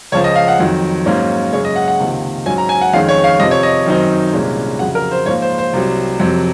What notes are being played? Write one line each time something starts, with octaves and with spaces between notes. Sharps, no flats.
C#2 C#3 F3 C#5
D#5
F5
F#5
F2 D#3 F#3
G#2 F#3 A#3 C#4
F#2 C#3 G#3 C#4 C#5
D#5
F#5
F#5
C#2 C3 D#3 A#3
G#2 F#3 C#4 G#5
A#5
G#5
F#5
F2 D#3 G#3 C#4 F5
C#5
F5
F2 C3 F3 D#5
C#5
D#5
F#2 D#3 F#3 C4 D#4
C2 A#2 G#3 C#4
F2 C#3 F#3 F#5
A#4
C5
G#2 F3 A#3 C#5
C5
C5
C2 C3 F#3
F2 C3 F#3